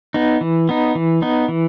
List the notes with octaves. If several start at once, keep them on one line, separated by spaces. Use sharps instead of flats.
B3 D#4
E3
B3 D#4
E3
B3 D#4
E3